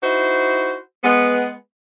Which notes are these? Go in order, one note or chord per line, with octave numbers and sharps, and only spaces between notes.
D#4 E4 F#4 C5
G#3 B3